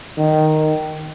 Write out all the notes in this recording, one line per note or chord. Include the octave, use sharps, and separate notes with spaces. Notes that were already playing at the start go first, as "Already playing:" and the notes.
D#3